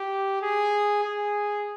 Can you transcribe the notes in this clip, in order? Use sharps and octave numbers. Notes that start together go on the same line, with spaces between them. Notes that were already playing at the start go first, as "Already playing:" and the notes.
Already playing: G4
G#4
G#4